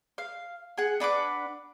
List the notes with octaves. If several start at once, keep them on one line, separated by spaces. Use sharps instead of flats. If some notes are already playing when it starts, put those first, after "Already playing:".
F5
G#4 F#5
D4 B4 F#5 D6